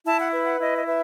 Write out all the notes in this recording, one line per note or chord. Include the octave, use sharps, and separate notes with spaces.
E4 A5
F#5
B4 E5
F#5
E4 D#5
D#5
B4 E5